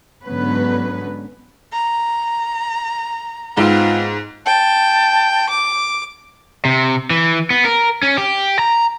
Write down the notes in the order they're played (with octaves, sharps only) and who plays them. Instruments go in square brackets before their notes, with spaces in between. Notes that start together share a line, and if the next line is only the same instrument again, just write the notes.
[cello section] G#2 D3 F#3 B3 C#4 B4
[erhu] A#5
[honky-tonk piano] G#2 [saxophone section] B3 C4 F4
[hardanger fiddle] G5 [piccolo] A5
[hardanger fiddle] D6
[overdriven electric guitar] C3
E3
B3
A#4
C#4
G4
A#5